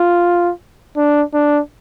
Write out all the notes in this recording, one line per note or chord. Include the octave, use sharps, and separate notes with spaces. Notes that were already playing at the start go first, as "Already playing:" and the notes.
Already playing: F4
D4
D4